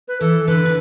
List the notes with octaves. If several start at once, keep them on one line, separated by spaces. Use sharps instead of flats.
B4
E3 A4
D3 B4
D3